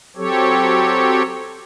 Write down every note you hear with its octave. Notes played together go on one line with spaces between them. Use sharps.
F#3 C4 G4 A4 C#5